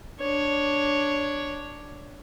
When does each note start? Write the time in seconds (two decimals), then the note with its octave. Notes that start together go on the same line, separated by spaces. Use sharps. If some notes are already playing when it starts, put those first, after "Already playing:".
0.20 D4 C#5